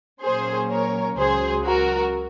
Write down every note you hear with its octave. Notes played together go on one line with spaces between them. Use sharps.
A#2 F#3 A#3 C#4 G#4 C5
A#4 C#5
C#2 C#3 F#3 G#4 C5
F#4 A#4